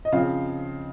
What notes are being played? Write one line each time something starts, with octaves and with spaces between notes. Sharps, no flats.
D#5
C#3 F3 C4 F5